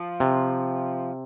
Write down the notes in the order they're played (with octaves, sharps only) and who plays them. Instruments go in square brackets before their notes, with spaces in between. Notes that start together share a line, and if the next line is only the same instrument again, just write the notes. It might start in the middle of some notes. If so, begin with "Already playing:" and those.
Already playing: [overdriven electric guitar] F3
[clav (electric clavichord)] C3